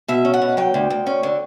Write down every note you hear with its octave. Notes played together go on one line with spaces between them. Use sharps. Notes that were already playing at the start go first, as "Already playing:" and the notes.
B2 E5
C#4
F#5
B2
F#3 G5
D2
D2
C#4
D3